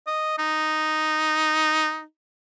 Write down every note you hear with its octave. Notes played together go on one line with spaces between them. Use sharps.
D#5
D#4